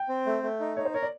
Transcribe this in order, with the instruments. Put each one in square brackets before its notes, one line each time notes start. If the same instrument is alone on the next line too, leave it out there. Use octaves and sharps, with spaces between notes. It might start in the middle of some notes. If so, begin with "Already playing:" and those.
Already playing: [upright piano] G5
[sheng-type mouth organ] C4
A3
A3
D#4
[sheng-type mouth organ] D#4 [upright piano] C#5
[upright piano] C5
[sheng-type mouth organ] A#4 [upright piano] C#5
[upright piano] D5